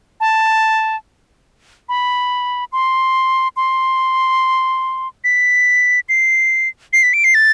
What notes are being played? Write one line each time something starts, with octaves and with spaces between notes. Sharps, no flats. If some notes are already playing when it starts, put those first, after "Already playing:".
A5
B5
C6
C6
B6
C7
C7
B6
D7
C7
A6